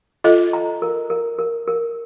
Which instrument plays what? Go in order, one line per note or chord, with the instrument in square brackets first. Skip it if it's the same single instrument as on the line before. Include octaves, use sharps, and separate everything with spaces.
[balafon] F4 A4 [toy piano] D#5
[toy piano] A#5
A#4
A#4
A#4
A#4